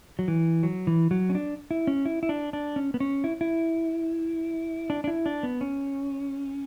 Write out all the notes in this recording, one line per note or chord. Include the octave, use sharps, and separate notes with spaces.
F#3
E3
F#3
E3
F#3
C#4
D4
E4
C#4
E4
E4
D4
D4
C#4
B3
C#4
E4
E4
D4
D4
E4
D4
B3
C#4